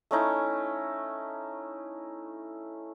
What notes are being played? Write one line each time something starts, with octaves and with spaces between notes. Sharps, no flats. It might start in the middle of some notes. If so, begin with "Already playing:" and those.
A3 C#4 D#4 E4